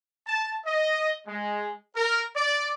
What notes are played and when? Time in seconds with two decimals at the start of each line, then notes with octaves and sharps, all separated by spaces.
0.27 A5
0.66 D#5
1.27 G#3
1.96 A#4
2.35 D5